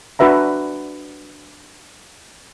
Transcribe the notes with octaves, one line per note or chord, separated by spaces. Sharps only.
D4 F#4 B4 E5 A#5